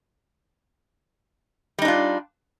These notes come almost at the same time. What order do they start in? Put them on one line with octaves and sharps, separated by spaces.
G3 D#4 D4 F4